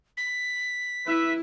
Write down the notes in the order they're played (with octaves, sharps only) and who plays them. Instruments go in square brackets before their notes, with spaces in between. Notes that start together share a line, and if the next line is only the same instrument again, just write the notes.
[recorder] B6
[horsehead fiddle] E4 [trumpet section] B4 E5